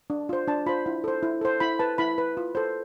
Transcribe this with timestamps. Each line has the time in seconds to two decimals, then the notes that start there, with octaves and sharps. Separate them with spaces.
0.10 D4
0.29 F4 C5
0.48 D4 A5
0.66 F4 C5 B5
0.86 E4
1.04 A4 C5
1.23 E4
1.41 A4 C5
1.60 E4 B5
1.79 B4 A5
1.98 E4 B5
2.18 B4
2.37 F4
2.55 A4 C5